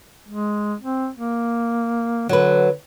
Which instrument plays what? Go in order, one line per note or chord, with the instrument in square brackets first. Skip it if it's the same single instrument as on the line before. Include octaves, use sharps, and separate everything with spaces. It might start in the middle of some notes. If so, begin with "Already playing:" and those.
[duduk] G#3
C4
A#3
[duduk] D3 [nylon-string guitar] F#3 B4